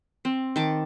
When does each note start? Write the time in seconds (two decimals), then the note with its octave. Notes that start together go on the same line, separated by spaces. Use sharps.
0.25 C4
0.56 D#3 A5 D6